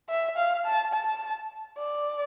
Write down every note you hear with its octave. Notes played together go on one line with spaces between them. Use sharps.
E5
F5
A5
A5
D5